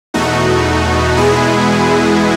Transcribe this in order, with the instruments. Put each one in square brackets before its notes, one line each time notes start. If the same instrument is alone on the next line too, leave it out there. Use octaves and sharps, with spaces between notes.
[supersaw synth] E2 B2 A3 D#4 F#4
E2 B2 G#3 B3 E4 G#4